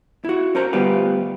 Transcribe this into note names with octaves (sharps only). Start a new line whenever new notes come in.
E4 F#4
C#4 A#4 C5 A#5
D2 G3 B3 F4 G4 B4